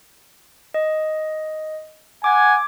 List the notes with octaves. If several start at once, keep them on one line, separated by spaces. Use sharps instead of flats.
D#5
F#5 G#5 D6 G#6